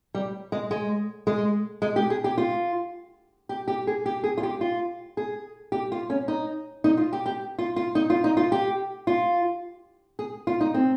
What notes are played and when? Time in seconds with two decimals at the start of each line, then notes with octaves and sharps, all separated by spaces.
0.15 G3
0.52 G#3
0.71 G#3
1.27 G#3
1.82 G#3
1.96 G4
2.10 G#4
2.24 G4
2.38 F4
3.49 G4
3.68 G4
3.87 G#4
4.06 G4
4.24 G#4
4.38 F4
4.43 G4
4.61 F4
5.17 G#4
5.72 G4
5.92 F4
6.10 C#4
6.28 D#4
6.84 D#4
6.97 F4
7.13 G4
7.26 G4
7.58 F4
7.76 F4
7.95 D#4
8.10 F4
8.24 D#4
8.37 F4
8.52 G4
9.07 F4
10.19 G#4
10.47 F4
10.61 D#4
10.74 C4